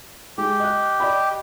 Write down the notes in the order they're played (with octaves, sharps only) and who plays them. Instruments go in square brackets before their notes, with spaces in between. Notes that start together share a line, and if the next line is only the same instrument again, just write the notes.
[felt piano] G#3 [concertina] G4
[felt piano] D#5 F#6
D5 D#5 B5